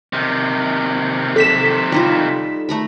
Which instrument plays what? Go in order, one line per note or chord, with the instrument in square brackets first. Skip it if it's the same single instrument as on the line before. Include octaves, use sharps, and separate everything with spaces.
[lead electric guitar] C3 D#3
[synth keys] A4 B6 E7
[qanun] G3 D#4 F4
A3 A#5 B5